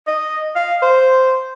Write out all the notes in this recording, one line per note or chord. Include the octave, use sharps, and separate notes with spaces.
D#5
F5
C5